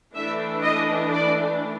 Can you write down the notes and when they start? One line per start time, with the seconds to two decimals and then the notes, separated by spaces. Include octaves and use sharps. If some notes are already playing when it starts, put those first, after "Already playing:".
0.14 E3 A3 D4 E5
0.63 D#5
1.13 D5